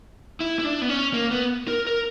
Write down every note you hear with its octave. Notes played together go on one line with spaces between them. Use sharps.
E4
E4
D4
B3
C#4
A#3
B3
A#4
A#4